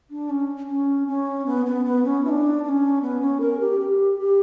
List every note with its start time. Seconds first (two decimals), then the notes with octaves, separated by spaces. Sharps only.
0.11 D4
0.30 C#4
0.69 C#4
1.08 C#4
1.46 B3
1.66 B3
1.85 B3
2.05 C#4
2.25 E4
2.29 D4
2.64 D4
2.69 C#4
3.02 B3
3.21 C#4
3.41 A#4
3.60 G4
3.80 G4
4.19 G4